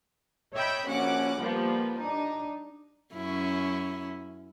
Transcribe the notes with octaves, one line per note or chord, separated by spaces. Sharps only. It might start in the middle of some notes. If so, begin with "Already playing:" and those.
C#5 D#5 E5 G5 B5
A#1 C#4 F#4 F#5 D6
F3 G3 A#3 B3
D4 D#4
F#2 C#4 E4